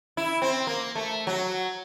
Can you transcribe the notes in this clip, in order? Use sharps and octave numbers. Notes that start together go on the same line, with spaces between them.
E4
C4
A#3
A3
F#3